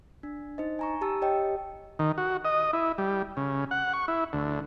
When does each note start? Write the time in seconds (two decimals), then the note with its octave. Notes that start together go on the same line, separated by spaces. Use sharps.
0.23 D4
0.58 D#4 C5 D#5
0.79 G#5 A#5 C#6
1.01 G4 A5 E6
1.22 G4 C#5 D#5 G5
1.99 D#3
2.18 F#4
2.45 D#5
2.73 E4
2.98 G3
3.37 C#3
3.71 F#5
3.93 C#6
4.08 E4
4.33 D2